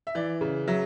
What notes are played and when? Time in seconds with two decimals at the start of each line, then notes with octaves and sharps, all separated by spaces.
0.07 E5
0.15 E3 D5
0.41 C#3
0.68 F#3 E5